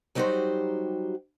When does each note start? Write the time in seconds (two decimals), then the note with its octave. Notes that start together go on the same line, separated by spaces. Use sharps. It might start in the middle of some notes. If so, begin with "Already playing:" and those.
0.15 F#3 G3 D#4 F#4 G4 C5